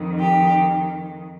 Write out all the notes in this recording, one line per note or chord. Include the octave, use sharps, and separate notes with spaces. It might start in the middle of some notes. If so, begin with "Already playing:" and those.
Already playing: F2 D#3
G4